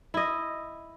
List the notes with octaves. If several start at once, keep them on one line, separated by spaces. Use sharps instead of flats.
E4 D#5